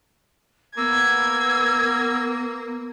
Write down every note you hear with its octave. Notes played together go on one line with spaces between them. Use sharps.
A#3 B3 E6 G#6